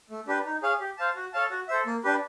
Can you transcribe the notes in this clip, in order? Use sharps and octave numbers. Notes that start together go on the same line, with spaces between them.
A3
D4 G4 B4
D#4
G#4 C#5 F5
G4
C5 F5 A5
F#4
A4 C#5 F5 A5
F#4
A4 C5 E5
A#3
D4 G4 B4